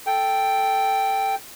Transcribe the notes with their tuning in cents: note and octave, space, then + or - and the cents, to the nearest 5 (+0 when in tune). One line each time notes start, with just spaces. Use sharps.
A4 +0 G5 +0